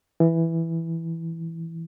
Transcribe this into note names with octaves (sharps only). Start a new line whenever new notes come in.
E3